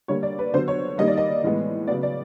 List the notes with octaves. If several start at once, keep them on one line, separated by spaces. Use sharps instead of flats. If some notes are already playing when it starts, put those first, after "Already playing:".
D3 G3 A#3 C#5
D5
B4
D3 F#3 B3 C5
C#5
D#3 G3 A#3 D#5
D5
D#5
A2 E3 G#3 B3
C#3 F#3 B3 D5
D5